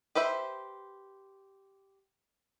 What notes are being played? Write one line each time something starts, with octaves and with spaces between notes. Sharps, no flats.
G4 B4 C5 E5